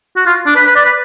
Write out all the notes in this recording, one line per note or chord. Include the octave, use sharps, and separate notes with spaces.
F#4
F4
D4
B4
B4
D5
B4